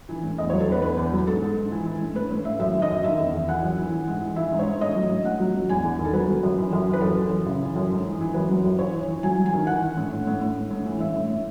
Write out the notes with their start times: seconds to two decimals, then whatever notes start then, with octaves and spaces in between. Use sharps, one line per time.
0.09 E3
0.24 A2
0.38 E2 D#5
0.50 F#3 C#5
0.60 A4
0.68 E2 B4
0.82 E2 B4
0.97 E2
1.12 F#3
1.27 G#2 A4
1.41 G#2
1.57 G#2
1.71 E3
1.86 E3
2.01 A2
2.15 A2 B4
2.31 A2
2.45 A2 E5
2.60 F#2 E5
2.74 D#3
2.82 D#5
2.89 F#2
3.03 D#3 E5
3.19 E2
3.33 E2
3.48 E3 F#5
3.62 F#2
3.78 E3
3.92 E3
4.07 G#2
4.21 E3
4.36 E3 E5
4.52 G#2
4.59 C#5
4.66 G#2
4.81 A2 D#5
4.96 F#3
5.10 A2
5.25 A2 F#5
5.40 F#3
5.54 F#3
5.69 E2 G#5
5.84 E2
5.99 D#3
6.05 A4
6.13 F#3 B4
6.28 F#3
6.43 F#2
6.58 E3
6.73 F#2
6.87 E3
6.93 B4
7.01 F#2 A4
7.17 E3
7.31 F#2
7.46 C#3
7.60 E3
7.76 F#2
7.91 G#2
8.05 E3
8.21 E3
8.34 F#2 B4
8.50 F#3
8.64 F#2
8.78 E3 C#5
8.94 E3
9.08 E3
9.23 F#3 G#5
9.38 F#3
9.46 G#5
9.53 D#3
9.67 E3 F#5
9.83 E3
9.97 A2
10.11 A2
10.27 A2
10.42 A2
10.56 A2
10.71 A2
10.86 E3
11.00 A2 E5
11.16 A2
11.30 A2